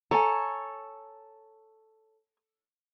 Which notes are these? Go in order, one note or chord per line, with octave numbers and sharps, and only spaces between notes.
A4 C#5 G#5 A#5